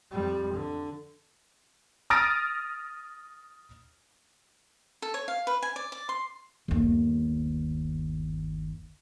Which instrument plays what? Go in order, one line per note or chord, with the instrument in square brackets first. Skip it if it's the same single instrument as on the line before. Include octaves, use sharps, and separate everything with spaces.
[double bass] F2 G3
D3
[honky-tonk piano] D#6 F6 A6 A#6 D7 D#7
[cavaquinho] A4
C#5
F5
B4
G#5
D5
D5
C6
[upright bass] G1 D#2